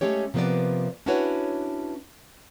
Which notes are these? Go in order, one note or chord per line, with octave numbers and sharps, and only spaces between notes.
G#3 A3 C#4 G4 C#5
C3 F3 A#3 B3 B4 D5
C#4 D4 E4 F#4 B4 C#5